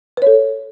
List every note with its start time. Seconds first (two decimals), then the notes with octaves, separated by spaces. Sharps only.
0.17 B4
0.22 C#5
0.27 A4